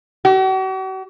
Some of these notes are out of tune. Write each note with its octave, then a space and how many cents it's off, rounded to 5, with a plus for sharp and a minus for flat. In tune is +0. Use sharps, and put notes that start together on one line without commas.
F#4 +45